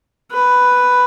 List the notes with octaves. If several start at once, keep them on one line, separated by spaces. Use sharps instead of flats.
B4